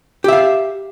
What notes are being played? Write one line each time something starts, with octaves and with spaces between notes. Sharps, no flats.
G4 E5 F5